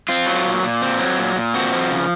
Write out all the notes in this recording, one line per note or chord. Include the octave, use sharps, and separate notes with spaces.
C4 F4
F#3
A#2
A#2
C4
F#3
A#2
A#2
C4 F#4
F3
C#3